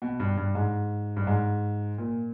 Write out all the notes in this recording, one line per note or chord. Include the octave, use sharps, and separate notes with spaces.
B2
G2
G2
G#2
G2
G#2
A#2